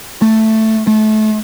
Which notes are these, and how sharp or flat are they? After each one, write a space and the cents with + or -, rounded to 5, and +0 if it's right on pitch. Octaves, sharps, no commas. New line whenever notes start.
A3 +5
A3 -30